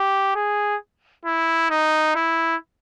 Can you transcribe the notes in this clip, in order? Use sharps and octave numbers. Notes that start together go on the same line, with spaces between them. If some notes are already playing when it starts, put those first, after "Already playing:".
Already playing: G4
G#4
E4
D#4
E4